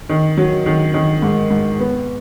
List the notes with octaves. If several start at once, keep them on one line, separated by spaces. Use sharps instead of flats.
D#3
F#3
D#3
D#3
G#2
G#2
B3